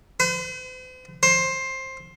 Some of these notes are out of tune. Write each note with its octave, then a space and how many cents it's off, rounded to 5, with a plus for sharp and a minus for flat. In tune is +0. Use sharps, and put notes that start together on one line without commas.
C5 -45
C5 +15